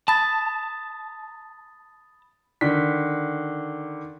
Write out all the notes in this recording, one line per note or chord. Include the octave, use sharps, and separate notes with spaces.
A5 B5 D#6 A6
D3 D#3 B6